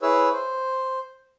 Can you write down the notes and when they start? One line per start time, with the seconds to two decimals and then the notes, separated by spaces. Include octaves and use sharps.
0.02 E4 G#4 B4 C#5 E6
0.32 C5